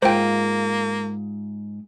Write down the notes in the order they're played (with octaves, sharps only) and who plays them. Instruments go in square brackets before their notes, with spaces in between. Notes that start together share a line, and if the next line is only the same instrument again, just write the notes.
[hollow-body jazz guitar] G#2 F4 [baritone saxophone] A#3 [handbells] C5 G5